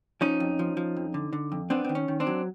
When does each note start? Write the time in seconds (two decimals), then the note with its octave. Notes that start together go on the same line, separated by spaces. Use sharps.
0.21 F3 C#4 D#4
0.40 F2
0.59 F3
0.77 F3
0.96 F2
1.14 D3
1.33 D3
1.52 F2
1.70 B3 C4 D4
1.84 D#3 C4
1.95 C#4
2.08 D#3
2.20 C4 D4
2.27 F#3